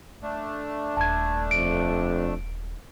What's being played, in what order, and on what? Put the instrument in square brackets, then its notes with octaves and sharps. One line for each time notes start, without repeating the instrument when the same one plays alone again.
[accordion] A3 D4
[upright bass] D#1 [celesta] A5 G#6
[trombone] F2 [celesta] D7